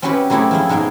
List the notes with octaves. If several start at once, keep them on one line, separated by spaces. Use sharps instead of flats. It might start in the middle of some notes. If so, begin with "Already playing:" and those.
C4 C#4 E4 F#4 G4 B4
F#3 A3 C4 E4 G4 G#4
F3 G#3 E4
G#2 B2 G#3 G#4 G5